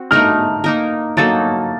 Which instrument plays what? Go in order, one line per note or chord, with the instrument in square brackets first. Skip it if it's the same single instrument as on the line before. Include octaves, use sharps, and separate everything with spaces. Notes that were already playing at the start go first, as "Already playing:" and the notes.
Already playing: [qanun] C4 F#4
[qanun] A3 D#4 A#4 [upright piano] F6
[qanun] A#3 D#4 A#4
[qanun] F#3 A#3 D#4 A4 [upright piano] A6